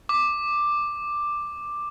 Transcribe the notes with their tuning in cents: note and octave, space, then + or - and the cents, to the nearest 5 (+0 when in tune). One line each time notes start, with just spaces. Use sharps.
D6 +5